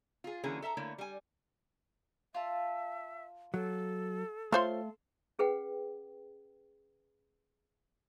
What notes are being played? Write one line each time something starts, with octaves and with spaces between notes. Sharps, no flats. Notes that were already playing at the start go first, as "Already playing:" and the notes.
F4 G#4
D3 E3 F#3 A#3 C#4 G#4
A4 E5 A5 A#5
D3 A3 A#3 E4 C#5
G3 G#5
F4 E5 A5
F#3 A4
A3 F4 C5 C#5 F5 A5 C6
C#4 G#4 B4 F#5 G5